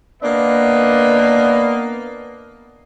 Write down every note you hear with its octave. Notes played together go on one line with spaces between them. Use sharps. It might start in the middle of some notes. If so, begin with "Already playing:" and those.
A#3 B3 D4 B4 D#5